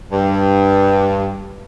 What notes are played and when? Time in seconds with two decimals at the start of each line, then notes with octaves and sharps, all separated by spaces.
0.12 G2